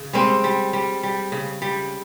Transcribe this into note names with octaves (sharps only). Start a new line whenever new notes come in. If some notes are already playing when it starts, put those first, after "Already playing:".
Already playing: C#3
G3 G#3 C4
G3
G3
G3
C#3
G3